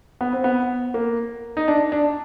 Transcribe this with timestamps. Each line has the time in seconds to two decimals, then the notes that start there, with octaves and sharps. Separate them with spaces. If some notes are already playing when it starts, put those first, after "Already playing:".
0.21 B3
0.33 C4
0.44 B3
0.94 A#3
1.57 D#4
1.68 D4
1.92 D4